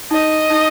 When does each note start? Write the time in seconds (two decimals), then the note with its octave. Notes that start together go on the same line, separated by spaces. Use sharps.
0.11 D#4 D#5
0.50 D#4